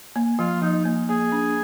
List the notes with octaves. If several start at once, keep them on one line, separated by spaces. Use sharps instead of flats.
A#3
F3 F4
F3 D#4
A#3
A#3 G#4
D4